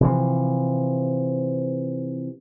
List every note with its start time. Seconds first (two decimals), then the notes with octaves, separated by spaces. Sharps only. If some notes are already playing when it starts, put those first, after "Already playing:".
0.01 C3 E3 F3